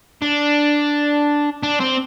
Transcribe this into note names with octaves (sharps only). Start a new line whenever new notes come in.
D4
D4
C4